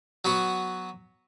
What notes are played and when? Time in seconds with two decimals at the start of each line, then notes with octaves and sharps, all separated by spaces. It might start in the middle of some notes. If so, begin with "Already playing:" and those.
0.25 F#3 B3 F#4